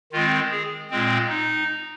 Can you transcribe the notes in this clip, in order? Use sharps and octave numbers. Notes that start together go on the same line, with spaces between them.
D#3 G#3 C4 F4
G#4
A#2 G#3 C4
D#4